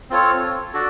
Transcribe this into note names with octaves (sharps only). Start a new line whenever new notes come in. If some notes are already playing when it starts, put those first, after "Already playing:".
C4 F4 A4 C#5
D4 F#4 A4 D5